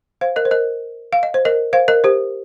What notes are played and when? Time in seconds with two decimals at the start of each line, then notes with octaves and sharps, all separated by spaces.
0.21 C5 F5
0.36 A#4 D#5
0.45 C5
0.51 A#4 D#5
1.13 F5
1.23 D#5
1.34 C5
1.45 A#4 D#5
1.73 C5 F5
1.88 A#4 D#5
2.04 G4 C5